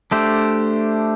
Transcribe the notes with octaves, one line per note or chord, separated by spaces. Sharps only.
A3 D4 G4 C5